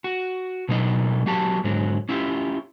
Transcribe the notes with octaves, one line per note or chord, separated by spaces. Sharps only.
F#4
B2 F#3 A#3 D#4 D#5
F#3 A#3 F#4 G4 A5
G#2 D3 F#3
C#4 E4 F4 G4